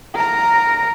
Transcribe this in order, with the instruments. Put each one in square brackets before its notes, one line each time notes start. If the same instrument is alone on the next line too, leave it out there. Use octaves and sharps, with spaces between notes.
[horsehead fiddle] A#4 A#5